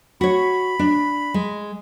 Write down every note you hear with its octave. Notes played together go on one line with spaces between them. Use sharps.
F#4 C#5 B5
D4
G#3